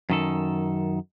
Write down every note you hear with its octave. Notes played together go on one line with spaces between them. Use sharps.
F#2 D#3 A4